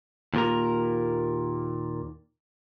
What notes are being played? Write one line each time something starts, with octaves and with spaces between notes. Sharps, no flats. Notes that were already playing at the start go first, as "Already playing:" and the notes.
D#2 A#2 A#4